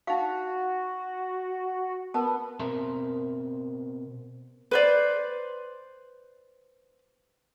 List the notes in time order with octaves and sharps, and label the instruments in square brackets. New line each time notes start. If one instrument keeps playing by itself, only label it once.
[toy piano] D#4 F5 [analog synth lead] F#4
[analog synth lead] B3 [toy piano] A#4 A5
[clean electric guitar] B2 C4 A#4 E5 A#5 C6
[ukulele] B4 C5 D5